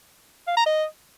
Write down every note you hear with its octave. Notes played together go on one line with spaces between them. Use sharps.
F5
A#5
D#5